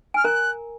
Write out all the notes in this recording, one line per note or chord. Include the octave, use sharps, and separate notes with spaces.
G#5 F6
A#4 A#5 F#6